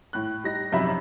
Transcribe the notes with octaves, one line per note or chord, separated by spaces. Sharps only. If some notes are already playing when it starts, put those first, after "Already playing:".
A2 F#6
G3 D#4 A#6
A#1 F#2 C3 D#4 E5 B5